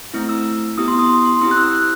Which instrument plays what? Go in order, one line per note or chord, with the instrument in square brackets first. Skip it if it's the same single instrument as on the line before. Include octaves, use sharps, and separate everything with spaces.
[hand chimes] A3 C4 E4
E6
B3 E4 G4 D#6
C6
D#6
C6
C6
C4 E4 G4 D#6
F#6
E6
F#6